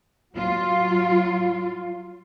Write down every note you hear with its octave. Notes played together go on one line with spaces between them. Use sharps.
F#3 F4